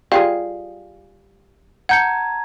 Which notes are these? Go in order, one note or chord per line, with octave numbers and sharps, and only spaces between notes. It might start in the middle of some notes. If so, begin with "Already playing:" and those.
G3 F4 G#4 F5
F#5 A5 A#5 G6 G#6 C#7